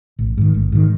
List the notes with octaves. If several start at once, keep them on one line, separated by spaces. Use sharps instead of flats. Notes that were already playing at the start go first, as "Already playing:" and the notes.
A1
G#2 D#3
A1
G#2 D#3